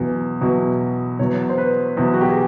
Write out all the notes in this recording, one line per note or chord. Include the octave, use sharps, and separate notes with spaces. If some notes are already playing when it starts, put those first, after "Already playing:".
Already playing: E2 B2 F#3
E2 B2 F#3
E2 B2 F#3 C#5
C5
B4
E2 B2 F#3
F#4
G4
G#4